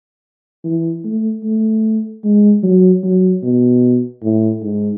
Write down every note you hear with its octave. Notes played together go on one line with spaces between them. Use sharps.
E3
A3
A3
G#3
F#3
F#3
B2
A2
G#2